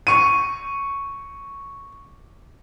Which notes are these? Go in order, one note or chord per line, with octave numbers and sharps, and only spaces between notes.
C#6 D#7